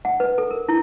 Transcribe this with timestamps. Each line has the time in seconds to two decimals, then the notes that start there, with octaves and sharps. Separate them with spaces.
0.05 F#5
0.20 B4
0.38 A4
0.51 A#4
0.69 E4